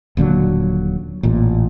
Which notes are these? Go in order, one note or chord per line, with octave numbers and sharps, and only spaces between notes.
D#1 A#2 D3 F#3
A1 A#2